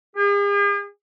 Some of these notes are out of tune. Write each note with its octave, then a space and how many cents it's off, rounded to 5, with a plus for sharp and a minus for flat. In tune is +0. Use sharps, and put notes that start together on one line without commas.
G#4 -45